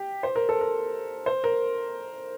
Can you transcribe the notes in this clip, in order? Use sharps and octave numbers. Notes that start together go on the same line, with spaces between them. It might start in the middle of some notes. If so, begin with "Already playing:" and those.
Already playing: G4
C5
A#4
A4
A#4
C5
A#4